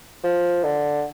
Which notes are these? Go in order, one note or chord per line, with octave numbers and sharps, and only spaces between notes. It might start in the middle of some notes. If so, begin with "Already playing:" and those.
F3
D3